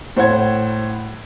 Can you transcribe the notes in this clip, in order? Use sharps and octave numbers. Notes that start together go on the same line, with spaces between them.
A2 C5 C#5 F#5 G#6